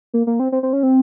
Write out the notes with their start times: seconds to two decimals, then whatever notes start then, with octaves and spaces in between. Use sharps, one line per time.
0.14 A#3
0.27 A#3
0.39 C4
0.52 C4
0.63 C4
0.73 C#4
0.83 C4